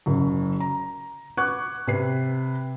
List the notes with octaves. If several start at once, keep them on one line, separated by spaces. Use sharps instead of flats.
F#1 F#2
A#5
B4 F#5 C#6 D6 F#6 G#6
C3 B4 C7